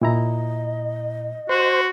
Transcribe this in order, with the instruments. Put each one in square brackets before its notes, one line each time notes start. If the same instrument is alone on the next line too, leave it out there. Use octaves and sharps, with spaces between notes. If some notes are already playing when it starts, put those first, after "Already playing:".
[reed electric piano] A#2 E4 A#5 [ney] D#5
[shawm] F#4 [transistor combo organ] C5